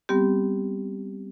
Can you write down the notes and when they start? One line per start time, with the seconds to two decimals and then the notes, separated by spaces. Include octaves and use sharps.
0.09 G3 B3 C4 G4